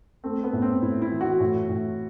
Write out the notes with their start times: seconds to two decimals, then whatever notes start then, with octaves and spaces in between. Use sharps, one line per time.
0.24 A3 C4
0.44 B3
0.53 A2
0.62 C4
0.82 A2 E4
1.02 E4
1.11 E3
1.21 F#4
1.40 A2
1.69 A2